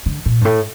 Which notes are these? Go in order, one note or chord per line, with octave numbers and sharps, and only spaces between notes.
D3
A#2
G2
A2